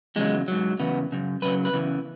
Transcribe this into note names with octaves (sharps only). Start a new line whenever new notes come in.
E2 C#3 F#3 G#3
G#2 F#3
E2 C#3 B3
F#2 C#3
F#2 C#3 F#3 B4
B4
E2 C#3 E3